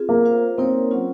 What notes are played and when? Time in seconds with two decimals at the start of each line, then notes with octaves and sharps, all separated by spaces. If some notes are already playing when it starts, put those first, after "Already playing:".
Already playing: C4 F4 G#4
0.09 A#3
0.25 F4 C5 F5
0.58 A#3 C4 D#4 A#4 C#5
0.91 F#3 C#4 F4